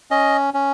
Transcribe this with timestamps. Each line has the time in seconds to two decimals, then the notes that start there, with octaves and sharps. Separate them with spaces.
0.11 C#4 D#5
0.54 C#4